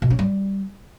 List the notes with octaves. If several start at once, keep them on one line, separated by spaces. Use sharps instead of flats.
B2
C#4
G3